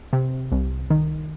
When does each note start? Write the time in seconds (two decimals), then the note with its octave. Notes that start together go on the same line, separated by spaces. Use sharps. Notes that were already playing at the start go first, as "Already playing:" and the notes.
0.13 C3
0.52 C2
0.90 D#3